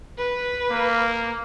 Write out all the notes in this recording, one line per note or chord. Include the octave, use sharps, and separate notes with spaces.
B4
A#3